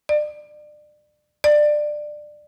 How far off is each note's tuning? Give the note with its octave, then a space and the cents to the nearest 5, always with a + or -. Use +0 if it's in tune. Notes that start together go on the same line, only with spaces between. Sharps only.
D5 +30
D5 +20